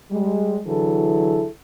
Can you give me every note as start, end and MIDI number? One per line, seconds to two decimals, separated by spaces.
0.11 0.59 55
0.11 0.59 56
0.66 1.46 50
0.66 1.46 52
0.66 1.46 54
0.66 1.46 64
0.66 1.46 68
0.66 1.46 69